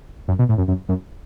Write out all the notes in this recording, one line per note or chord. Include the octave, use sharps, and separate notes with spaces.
F#2
B2
A2
F#2
F#2
F#2